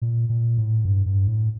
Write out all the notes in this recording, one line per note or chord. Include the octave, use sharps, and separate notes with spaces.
A#2
A#2
A2
G2
G2
A2